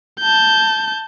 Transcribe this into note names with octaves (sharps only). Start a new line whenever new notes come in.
A5 G6